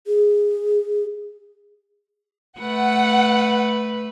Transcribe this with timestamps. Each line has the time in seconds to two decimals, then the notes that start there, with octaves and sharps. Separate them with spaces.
0.07 G#4
2.60 A3 B4 F#5